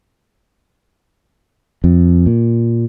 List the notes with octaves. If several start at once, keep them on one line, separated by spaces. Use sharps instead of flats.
F2
A#2